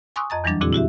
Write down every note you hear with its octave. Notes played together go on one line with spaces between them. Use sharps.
G#5 C6 C#6 D#6 E6 F#6
F2 D#5 A#5 A6
E2 E3 F#3 G3 D4 A6
A#2 D3 C4 E4 F#4 G#4
E4 F#4 G4 E5